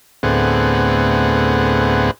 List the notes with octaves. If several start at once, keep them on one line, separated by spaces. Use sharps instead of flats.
D2 A2 B3 C4 G#4 F#5